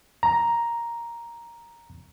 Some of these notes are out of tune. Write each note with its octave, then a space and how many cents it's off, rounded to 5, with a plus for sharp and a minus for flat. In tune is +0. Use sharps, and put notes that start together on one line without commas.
A#5 +5